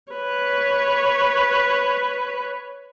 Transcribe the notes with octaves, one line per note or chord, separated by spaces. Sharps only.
B4 C#5